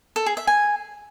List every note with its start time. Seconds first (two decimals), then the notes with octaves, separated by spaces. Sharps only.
0.16 A4
0.26 G#4
0.37 E5
0.47 G#5